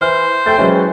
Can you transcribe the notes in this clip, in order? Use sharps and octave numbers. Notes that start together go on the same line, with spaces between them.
E3 C5 F6
A3 G5 G6 A6
E3 F#3 G#3 C#4